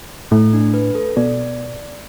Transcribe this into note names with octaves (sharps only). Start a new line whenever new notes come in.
A2 A3
D4
B4
A4
B2 D5